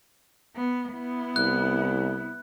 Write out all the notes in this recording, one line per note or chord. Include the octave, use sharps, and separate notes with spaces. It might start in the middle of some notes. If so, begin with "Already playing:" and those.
B3
B3 E4
C2 F#6